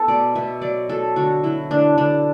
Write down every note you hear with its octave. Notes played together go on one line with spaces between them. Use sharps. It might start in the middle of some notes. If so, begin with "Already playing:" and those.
Already playing: B3 A4
B2 D5
B2 E5
F#3 D5
F#3 A4
D3 F#4
F#3 E4
D3 D4
D3 D4